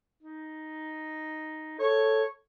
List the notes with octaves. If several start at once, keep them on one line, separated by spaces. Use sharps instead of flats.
D#4
A4 C#5